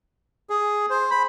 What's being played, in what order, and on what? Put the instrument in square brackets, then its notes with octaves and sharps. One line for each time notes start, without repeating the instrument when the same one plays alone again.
[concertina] G#4
C5
B5